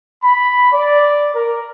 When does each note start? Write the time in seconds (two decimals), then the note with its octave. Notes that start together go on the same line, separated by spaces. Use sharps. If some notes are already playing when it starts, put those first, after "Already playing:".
0.23 B5
0.72 D5
1.34 A#4